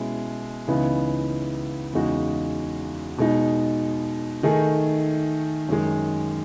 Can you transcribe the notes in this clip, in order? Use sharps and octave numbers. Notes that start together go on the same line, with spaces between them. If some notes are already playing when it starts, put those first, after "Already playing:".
Already playing: B2 G#3 C#4 E4
C#2 C#3 E3 B3 D#4
E2 C#3 G#3 D#4 F#4
B2 G#3 D#4
D#3 A3 D#4 G#4
F#2 D#3 G#3